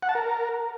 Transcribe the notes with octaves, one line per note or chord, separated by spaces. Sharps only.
F#5
A5
A#4